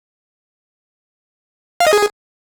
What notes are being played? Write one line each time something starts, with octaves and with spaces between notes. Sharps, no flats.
F5
D#5
G#4